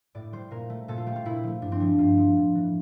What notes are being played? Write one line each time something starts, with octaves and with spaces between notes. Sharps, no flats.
A2 D5
G3 C5
A#2 A#4
A3
A#2 A4
F4
A3 G4
F4
A#2 E4
F3 A3
G2 D4
C4
F3 A3 D4
G2 F4
F3 A3
A2
E3 A3